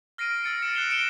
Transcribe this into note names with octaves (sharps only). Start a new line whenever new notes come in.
F6 A#6 C7 D7 D#7
E6 A6 C#7 D#7
A#6 C#7 D7 E7
F#6 C7 F7 G7
C#7 D7 E7 G7